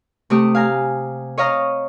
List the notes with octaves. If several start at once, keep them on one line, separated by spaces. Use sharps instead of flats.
C3 A3 G4 D#6
F5 G#5 A#5
C#5 D#5 F5 A#5 D#6